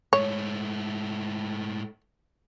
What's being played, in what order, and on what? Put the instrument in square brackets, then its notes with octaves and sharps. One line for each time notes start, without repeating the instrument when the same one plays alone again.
[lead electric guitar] G#2 A3 [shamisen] C#5